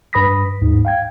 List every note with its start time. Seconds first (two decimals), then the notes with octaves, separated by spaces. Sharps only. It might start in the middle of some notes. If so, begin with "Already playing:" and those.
0.13 G2 B4 B5 D#6 A#6 B6
0.61 D#2 G#2
0.85 F5 G5 G#6